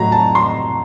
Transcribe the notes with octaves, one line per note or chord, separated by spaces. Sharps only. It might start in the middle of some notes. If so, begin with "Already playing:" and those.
Already playing: A2 F#3 A#5
A5
C6